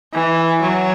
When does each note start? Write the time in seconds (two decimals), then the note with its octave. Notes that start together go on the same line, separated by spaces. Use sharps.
0.13 E3
0.62 F#3